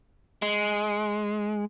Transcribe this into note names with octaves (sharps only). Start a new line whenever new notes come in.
G#3